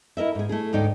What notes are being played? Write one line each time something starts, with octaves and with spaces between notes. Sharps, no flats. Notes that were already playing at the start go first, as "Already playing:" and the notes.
E4 A#4 D#5 E5
G#2 G#4
A3 E4 G#4
D2 G#2 D#4 D5 G5